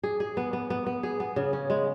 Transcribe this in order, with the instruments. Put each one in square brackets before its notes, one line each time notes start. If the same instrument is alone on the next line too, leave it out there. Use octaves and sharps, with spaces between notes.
[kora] G#4
G#4
B3
B3
B3
B3
G#4
B3
C#3
C#4
G#3